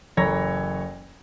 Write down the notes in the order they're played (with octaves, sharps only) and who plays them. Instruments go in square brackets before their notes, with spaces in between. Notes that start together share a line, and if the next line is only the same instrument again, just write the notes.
[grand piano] F#1 E3 A4 C#5 A#5 A#6